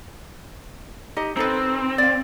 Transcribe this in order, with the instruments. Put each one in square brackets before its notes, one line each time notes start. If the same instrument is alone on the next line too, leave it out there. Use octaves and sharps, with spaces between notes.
[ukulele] D#4 G4 D#5
[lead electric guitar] C4 [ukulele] D#4 A4 B4
[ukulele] D5 F5